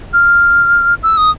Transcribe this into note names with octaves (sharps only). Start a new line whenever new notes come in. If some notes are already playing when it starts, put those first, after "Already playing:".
F6
E6
D#6